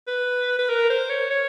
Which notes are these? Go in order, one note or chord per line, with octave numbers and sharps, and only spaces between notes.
B4
B4
A#4
C5
C#5
C#5